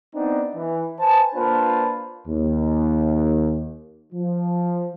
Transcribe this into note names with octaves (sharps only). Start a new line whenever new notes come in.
B3 C4 D4 D#4
E3
B4 C5 G#5 A5
A#3 D4 F4 B4 C5 A5
D#2
F3